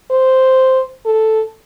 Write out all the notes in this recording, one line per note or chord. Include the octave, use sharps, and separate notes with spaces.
C5
A4